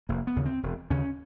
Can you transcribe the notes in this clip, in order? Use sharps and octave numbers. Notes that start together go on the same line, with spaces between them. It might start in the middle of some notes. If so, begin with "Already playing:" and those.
F1 A#3
B3
D#2 C#3
C4
E1
D#2 C#3 C#4